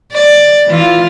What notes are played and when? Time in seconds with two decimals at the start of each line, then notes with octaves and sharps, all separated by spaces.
0.13 D5
0.67 E3 F4